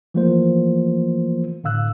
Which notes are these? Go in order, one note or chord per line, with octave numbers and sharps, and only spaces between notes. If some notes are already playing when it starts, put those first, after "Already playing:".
E3 F3 A3 A#3 F4 C5
A2 D3 F5 E6 F#6